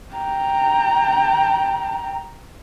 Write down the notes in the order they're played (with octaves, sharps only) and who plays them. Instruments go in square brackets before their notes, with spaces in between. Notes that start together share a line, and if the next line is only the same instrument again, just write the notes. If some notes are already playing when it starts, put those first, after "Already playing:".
[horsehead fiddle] G5 A#5